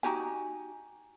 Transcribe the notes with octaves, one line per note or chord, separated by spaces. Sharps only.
D#4 F#4 G4 G#5